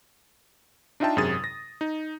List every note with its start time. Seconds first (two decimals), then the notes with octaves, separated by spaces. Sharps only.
1.00 D4 D#4 F4 E5 G5 A5
1.16 G#1 F#2 C3 G#4 D#6 A6
1.44 A#6
1.81 D#4